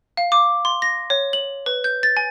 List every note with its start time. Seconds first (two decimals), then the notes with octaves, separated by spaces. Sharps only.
0.17 F5
0.32 D6
0.65 C6
0.82 A#6
1.10 C#5
1.33 F#7
1.66 B4
1.84 G6
2.03 A6
2.17 G#5